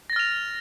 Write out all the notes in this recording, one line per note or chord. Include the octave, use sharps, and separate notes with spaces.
F6 A6 A#6 F7